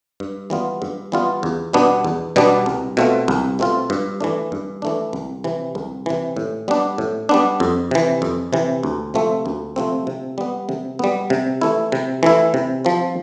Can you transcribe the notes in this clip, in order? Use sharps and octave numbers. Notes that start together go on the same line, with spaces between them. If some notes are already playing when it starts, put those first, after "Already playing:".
G2
E3 G3 B3 F4
G2
E3 G3 B3 F4
E2
B2 G3 B3 D4
E2
B2 G3 B3 D4
C2
B2 A3 C4 F4
C2
B2 A3 C4 F4
G2
E3 A3 D4
G2
E3 A3 D4
C2
C3 E3
C2
C3 E3
A2
G3 B3 D4
A2
G3 B3 D4
F2
C3 E3
F2
C3 E3
D2
C3 F3 A3 C4
D2
C3 F3 A3 C4
C3
G3 B3
C3
G3 B3
C3
E3 A3 E4
C3
E3 A3 E4
C3
F3 C4